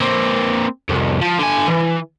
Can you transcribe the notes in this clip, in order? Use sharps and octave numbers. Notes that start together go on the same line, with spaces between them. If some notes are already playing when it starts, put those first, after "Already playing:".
A#3 C4
C2 F2
F3
D3 G#5
E3